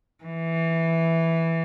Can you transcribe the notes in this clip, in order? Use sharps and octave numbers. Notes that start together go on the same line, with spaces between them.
E3